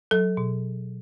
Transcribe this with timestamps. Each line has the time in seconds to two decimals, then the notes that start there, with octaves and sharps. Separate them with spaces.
0.11 F#3 A4
0.37 B2